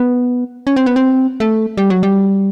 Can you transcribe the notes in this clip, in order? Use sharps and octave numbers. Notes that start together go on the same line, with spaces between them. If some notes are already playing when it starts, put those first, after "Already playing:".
Already playing: B3
C#4
C4
B3
C4
A3
G3
F#3
G3